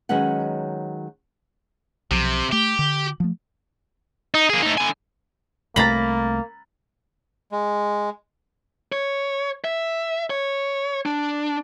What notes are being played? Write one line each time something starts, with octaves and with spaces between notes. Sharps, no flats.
D#3 F#3 G#3 C#4 B4 F#5
B1 C3 F3
A3 G4
D3
F3 A3
D#4
A#3 G#4
A3 D#4
D3 G#5
C2 C3 A3 A#3 A#5 B5 A6 F#7
G#3
C#5
E5
C#5
D4